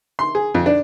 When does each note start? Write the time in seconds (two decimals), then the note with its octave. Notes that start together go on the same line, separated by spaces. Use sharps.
0.19 C6
0.35 G#4
0.54 F2
0.66 D4